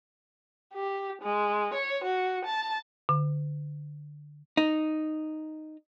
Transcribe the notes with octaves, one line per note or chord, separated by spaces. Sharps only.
G4
G#3
C#5
F#4
A5
D3
D#4